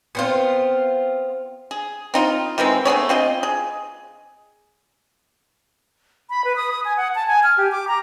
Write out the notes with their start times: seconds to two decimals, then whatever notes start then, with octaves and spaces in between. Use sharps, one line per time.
0.15 B3 C4 F4
1.71 G#4
2.14 C4 D#4 F4
2.58 D#3 E3 G#3 C4
2.85 A3 B3 G#4 C#5
3.09 C4 F4 G#4 D#5
3.43 G#4
6.30 B5
6.45 B4
6.56 D#6
6.71 D#6
6.85 G#5
6.97 F#5
7.15 A5
7.27 G#5
7.44 F6
7.57 G4
7.72 D6
7.88 A#5